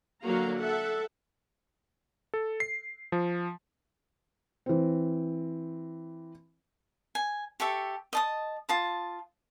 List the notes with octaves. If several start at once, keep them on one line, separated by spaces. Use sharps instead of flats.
D3 F#3 A#3 F#4 F5 A#5
A4 E5 F#5
A4
C7
F3
E3 C4
G#5
G4 A4 E5 C#6
D#5 A5 D#6
F4 A5 D#6